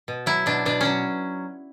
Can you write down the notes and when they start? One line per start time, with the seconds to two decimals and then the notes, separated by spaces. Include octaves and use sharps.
0.08 B2
0.26 F#3 E4
0.46 B2 D4
0.65 B2 D4
0.81 F#3 C#4